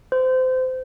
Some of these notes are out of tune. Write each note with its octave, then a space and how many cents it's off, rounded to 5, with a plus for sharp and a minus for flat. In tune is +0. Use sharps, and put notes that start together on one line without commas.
C5 -25